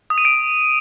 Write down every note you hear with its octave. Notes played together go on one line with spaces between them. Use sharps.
D#6
D#7
D7